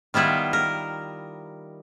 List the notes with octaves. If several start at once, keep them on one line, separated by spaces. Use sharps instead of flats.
D#3 G3 B3 E4 F4
A#4